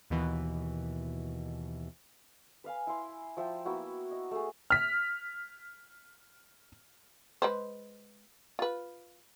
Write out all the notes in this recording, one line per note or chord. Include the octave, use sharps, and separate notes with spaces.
D#2 B2 E3
B4 F5 G#5
E4 C6
F3 E5 G5
A#3 B3 E4 F#4
D#5
A3 G#4
F6 B6
G#3 B4 C5
F4 B4